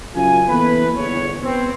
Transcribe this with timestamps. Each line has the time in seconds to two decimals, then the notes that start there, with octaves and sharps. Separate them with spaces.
0.15 F#2 C#3 F4 G#5
0.48 E3 A#3 B3 E4 A4 B4
0.97 G1 E2 C#5
1.43 B3 C4